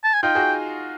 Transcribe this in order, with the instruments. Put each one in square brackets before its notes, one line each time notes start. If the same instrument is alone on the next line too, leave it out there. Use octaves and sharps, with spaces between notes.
[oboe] A5
G#5
[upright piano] D#4 F4 [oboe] G5
[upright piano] F#4 G#4